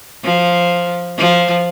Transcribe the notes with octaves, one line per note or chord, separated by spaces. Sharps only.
F3
F3